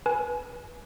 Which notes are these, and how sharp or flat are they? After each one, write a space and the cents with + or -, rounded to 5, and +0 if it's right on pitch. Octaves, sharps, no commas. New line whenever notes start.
B4 -30 G#5 +15